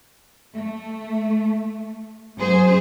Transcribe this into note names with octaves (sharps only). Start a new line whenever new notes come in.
A3
F#2 G#4 C5